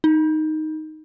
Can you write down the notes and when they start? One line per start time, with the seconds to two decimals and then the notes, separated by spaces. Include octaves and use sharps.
0.04 D#4